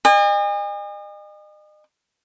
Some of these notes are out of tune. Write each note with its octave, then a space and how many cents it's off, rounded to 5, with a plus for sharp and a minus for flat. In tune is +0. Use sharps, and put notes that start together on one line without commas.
D#5 -40 G#5 -40